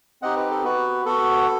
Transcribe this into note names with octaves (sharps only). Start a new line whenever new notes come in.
C4 D#4 G4 D#5 F#5
B4
A4
B3 F#4 B4
B3 F#4 A4